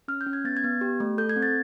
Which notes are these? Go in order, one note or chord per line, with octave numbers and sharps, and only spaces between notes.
C#4 F6
G6
C#4
G#6
B3 A6
G#6
B3
G4
A3
A4 G6
G#6
C4
A6